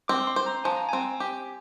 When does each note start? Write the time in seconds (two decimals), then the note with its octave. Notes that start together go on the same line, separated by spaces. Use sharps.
0.08 C4 D6
0.27 C6
0.36 C5
0.46 A#5
0.64 F3 G#5
0.76 A#5
0.89 C4 G#5
1.20 G4